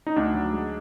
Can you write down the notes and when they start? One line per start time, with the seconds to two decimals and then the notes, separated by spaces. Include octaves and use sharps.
0.07 D#4
0.16 D2 D4
0.34 F#3
0.52 G#3